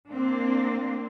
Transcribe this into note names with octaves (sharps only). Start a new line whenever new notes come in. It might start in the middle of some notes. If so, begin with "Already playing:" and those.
A#3 C4 D4